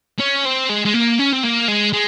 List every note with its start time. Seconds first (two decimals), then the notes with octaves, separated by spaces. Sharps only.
0.19 C#4
0.45 C4
0.69 G#3
0.85 G#3
0.94 A#3
1.19 C#4
1.33 C4
1.43 A#3
1.68 G#3
1.93 G#3